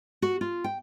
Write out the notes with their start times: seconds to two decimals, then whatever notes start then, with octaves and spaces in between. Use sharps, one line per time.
0.22 F#4
0.41 F4
0.64 G5